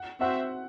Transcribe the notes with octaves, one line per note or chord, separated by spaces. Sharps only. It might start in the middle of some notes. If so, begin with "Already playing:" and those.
Already playing: F#5
C4 F#4 C5 E5 F#5